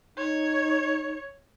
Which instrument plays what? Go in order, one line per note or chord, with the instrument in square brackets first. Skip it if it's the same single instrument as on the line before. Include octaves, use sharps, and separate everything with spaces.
[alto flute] D#4 [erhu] C#5